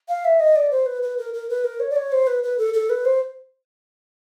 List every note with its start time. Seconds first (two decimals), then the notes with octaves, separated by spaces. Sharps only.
0.08 F5
0.25 E5
0.40 D#5
0.56 D5
0.71 C5
0.86 B4
1.03 B4
1.18 A#4
1.34 A#4
1.50 B4
1.64 A#4
1.80 C#5
1.90 D5
1.96 C#5
2.12 C5
2.27 B4
2.43 B4
2.58 A4
2.74 A4
2.90 B4
3.05 C5